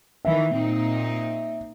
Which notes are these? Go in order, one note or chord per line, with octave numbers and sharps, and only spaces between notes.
D#3 E3 E5
A#2 C4 D#4